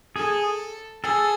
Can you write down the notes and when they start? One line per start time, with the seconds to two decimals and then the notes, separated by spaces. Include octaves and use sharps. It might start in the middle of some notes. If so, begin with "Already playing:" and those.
0.16 G#4 A4
1.03 G#4 A4